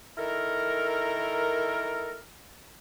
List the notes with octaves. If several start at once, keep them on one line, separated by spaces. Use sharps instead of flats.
D#3 E4 A4 A#4